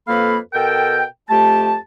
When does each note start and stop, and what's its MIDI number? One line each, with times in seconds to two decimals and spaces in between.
0.07 0.38 41
0.07 0.38 58
0.07 0.38 69
0.07 0.38 71
0.07 0.38 77
0.07 0.38 83
0.53 1.03 47
0.53 1.03 69
0.53 1.03 70
0.53 1.03 79
1.29 1.76 41
1.29 1.76 57
1.29 1.76 67
1.29 1.76 81